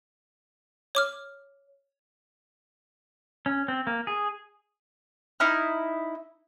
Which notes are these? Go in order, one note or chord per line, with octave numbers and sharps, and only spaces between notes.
C#5 D6 F6
C#4
C4
A#3
G#4
D#4 E4 F6